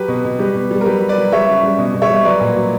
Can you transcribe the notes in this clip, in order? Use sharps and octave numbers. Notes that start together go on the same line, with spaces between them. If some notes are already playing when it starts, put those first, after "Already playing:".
Already playing: F#3 G4 B4
B2
B2
G3 G4 B4
B2
G3
A#4
F#3 G4 B4
F#3
B4 D5
F#3
G3 C#5 E5
C#3
G3
B2
B2
C#5 E5
G3
F#3 B4 D5
A#2
F#3